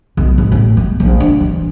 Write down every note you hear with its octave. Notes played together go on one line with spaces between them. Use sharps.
B1
G#2
A1
B3
A#1
D4
E3